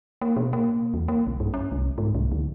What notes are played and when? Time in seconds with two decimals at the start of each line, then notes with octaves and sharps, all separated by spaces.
0.21 A#3
0.36 B2
0.53 A#3
0.94 E2
1.08 A#3
1.27 B1
1.40 G2
1.54 C#4
1.72 C2
1.98 G#2
2.15 C2
2.32 D2